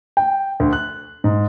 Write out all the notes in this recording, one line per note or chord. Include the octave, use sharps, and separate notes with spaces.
G5
D2
F#6
G#2